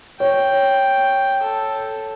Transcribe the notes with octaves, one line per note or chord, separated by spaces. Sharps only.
C#5 G5
A4